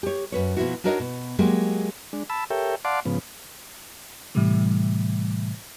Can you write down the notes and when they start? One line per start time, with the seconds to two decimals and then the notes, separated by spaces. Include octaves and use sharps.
0.03 G4 C#5
0.32 F#2 B4 C#5
0.57 B2 F3 E4 F#4
0.84 D4 D#4 F#4 A#4 C#5 D#5
1.00 B2
1.39 F#3 G#3 A#3 G4
2.13 G#3 D4
2.30 A5 B5 E6
2.50 G4 A4 A#4 C#5 E5 G5
2.85 D5 F5 F#5 A5 C6 D6
3.05 G#2 C#3 F3 B3
4.35 A2 C3 E3 G3 A3